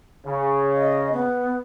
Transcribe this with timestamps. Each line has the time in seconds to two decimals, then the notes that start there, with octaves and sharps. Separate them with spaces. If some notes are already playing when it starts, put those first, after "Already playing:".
0.24 C#3
0.75 D#5
1.13 B3